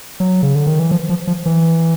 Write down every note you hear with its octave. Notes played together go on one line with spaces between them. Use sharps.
F#3
C#3
D3
D#3
E3
F3
F3
F3
E3